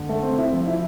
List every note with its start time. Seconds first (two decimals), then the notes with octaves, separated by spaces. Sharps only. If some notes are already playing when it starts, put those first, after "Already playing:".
Already playing: D3
0.09 A3
0.23 C4
0.38 E4
0.53 F3
0.67 E4